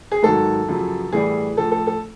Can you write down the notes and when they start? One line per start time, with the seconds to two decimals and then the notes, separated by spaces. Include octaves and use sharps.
0.12 G#4
0.23 G#2 D#3 F#3 A4
0.68 F#2 C#3 F3
1.12 A2 E3 G3 G#4
1.57 A2 F3 A4
1.72 A4
1.87 A4